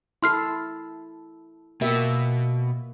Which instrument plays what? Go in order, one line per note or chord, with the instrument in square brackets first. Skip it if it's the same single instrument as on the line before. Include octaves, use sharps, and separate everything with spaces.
[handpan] E4 A4 [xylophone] C6 F6 C7
[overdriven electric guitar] B2 [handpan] A#3 G4 E5